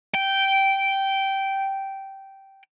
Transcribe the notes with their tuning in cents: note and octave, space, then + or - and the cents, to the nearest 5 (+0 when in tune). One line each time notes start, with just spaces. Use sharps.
G5 -10